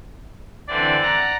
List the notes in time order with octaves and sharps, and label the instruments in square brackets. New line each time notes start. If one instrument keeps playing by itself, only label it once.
[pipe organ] D3 E3 C4 [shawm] D5
[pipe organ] F#5 A#5